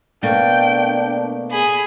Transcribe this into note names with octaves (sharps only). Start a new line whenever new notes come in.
B2 A3 A#3 D4 G5
G#4 B5